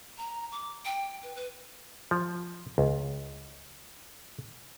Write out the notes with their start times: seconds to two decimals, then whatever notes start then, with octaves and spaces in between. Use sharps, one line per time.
0.17 A#5
0.52 D6
0.85 G5
1.23 B4
1.35 B4
2.11 F3
2.78 C#2